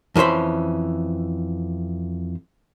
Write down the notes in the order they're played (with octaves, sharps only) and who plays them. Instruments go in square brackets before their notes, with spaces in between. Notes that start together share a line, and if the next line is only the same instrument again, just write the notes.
[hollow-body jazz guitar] F2 E3 C#4 C5 B5